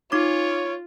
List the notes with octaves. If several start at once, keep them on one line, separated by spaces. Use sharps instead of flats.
D#4 F4 C#5 D6